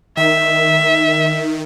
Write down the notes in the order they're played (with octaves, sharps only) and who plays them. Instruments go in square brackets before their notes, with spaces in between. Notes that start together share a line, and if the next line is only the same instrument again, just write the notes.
[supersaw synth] D#3 [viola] E5